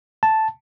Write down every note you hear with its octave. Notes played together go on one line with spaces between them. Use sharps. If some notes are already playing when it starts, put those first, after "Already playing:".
A5